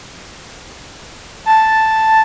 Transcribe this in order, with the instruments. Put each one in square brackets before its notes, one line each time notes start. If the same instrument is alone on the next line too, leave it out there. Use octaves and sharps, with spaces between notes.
[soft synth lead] A5